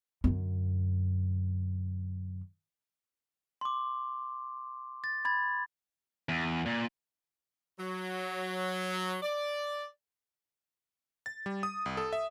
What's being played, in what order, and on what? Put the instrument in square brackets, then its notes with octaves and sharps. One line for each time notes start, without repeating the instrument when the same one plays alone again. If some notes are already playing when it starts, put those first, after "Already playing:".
[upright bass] F#2 D3
[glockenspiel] C6 D6
A6
B5 G#6 A6
[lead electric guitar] E2
A#2
[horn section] F#3
D5
[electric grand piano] A6
G3
D#6
C2
A4
E5